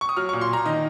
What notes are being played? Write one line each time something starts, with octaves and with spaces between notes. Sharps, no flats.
C#6
D#6
F#3 F6
C#6
A#2
C6
A#2 A#5
D#3 D#5